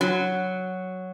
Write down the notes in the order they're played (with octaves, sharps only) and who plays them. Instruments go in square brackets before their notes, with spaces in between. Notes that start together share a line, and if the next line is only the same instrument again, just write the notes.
[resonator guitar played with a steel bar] F#3